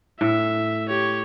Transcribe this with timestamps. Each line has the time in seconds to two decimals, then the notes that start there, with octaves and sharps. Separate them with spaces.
0.21 A2 E5
0.89 G4 C#5